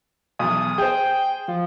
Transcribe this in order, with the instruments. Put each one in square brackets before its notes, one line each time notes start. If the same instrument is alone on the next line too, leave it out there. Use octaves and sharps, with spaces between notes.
[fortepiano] B1 E2 [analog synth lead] D#6
[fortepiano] G#4 C5 [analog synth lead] G5
[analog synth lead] F3